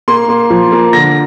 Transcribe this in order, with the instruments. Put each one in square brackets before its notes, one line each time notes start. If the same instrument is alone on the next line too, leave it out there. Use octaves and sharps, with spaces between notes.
[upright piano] A#3 C6
A#3
F3
A#3
D3 A#6